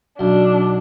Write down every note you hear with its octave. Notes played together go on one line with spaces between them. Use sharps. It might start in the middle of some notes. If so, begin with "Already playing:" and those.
B1 D4